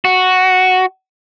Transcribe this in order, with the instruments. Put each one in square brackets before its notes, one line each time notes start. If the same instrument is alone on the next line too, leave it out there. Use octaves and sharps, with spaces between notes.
[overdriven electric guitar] F#4